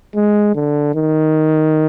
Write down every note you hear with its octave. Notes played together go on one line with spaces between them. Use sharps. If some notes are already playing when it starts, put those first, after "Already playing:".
G#3
D3
D#3